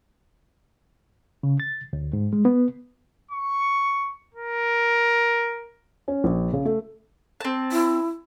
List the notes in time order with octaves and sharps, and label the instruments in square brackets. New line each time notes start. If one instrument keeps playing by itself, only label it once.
[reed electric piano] C#3
A6
D2
G#2
G#3
B3
[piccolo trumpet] C#6
A#4
[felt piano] C#4
A#1
C#3
A3
[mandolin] C4 A5
[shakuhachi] E4